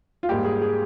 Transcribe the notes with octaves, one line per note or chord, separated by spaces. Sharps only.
F4
G#2 G3 A#3 G4
G#4
G#4